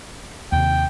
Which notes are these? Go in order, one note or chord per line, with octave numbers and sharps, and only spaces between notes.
D#2 C3 G5